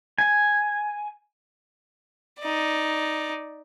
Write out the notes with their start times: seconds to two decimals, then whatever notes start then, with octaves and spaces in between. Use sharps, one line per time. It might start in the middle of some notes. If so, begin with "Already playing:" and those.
0.18 G#5
2.40 D#4 D5